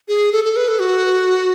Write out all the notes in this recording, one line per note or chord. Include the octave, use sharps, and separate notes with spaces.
G#4
A4
A4
B4
A4
F#4